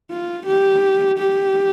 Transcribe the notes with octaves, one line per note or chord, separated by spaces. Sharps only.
F4
G4
G4